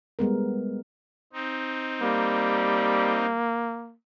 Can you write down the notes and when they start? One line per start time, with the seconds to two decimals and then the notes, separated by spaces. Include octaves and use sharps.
0.19 G3 G#3 B3 A#4
1.33 C4 D#4
2.02 G3 A#3